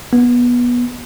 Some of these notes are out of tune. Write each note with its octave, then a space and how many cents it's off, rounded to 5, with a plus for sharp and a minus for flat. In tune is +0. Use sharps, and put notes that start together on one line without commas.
B3 -20